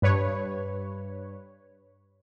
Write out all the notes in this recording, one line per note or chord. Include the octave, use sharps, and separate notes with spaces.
G2 B4 C#5